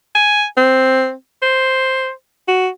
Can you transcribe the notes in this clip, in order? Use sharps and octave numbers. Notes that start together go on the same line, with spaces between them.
G#5
C4
C5
F#4